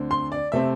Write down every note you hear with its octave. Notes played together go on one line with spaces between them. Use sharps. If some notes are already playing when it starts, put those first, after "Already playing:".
Already playing: D2 D3 C4
C6
D5
C3 A3 C4 E5